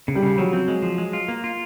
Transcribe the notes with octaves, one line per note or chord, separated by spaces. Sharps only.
C#3
G3
C#3
F3 F#3
C4
G#3
F3
G#3
F4
A#3
F4